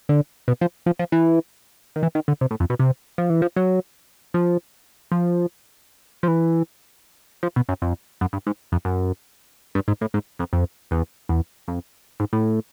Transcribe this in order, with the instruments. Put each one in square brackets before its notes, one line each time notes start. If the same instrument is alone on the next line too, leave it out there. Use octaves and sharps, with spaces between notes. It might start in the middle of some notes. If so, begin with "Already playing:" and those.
[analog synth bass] D3
B2
F3
F3
F3
E3
D#3
E3
D#3
D3
C3
A2
F2
B2
C3
F3
E3
F3
F#3
F3
F3
F3
E3
F3
B2
F#2
F2
F#2
G2
G#2
F2
F#2
G2
G#2
A2
G#2
F2
F2
E2
E2
F2
G#2
A2